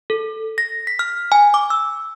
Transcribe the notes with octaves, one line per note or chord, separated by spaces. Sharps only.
A4
A#6
B6
F6
G#5
D6
E6